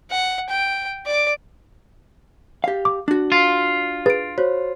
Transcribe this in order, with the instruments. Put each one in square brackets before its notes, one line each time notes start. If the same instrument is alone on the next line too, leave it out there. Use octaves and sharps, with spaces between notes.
[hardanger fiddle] F#5
G5
D5 D6
[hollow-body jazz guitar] G4 F5
[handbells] D6
[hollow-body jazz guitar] D4 F#4
[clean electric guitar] F4
[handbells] G#4 B4 [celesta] A6 D7
[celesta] F#4 C5 C#5